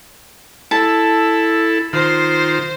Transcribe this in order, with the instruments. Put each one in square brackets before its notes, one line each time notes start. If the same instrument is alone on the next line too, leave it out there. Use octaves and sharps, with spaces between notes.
[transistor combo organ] E4 A4 [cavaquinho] A5
[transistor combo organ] D#3 F4 [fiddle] C5